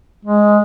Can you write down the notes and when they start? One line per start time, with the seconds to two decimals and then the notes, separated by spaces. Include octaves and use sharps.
0.25 G#3